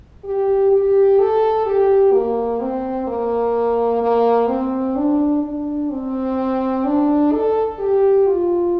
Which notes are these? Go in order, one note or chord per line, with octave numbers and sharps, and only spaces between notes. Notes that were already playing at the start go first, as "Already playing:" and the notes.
G4
G4
A4
G4
A#3
C4
A#3
A#3
C4
D4
D4
C4
D4
A4
G4
F4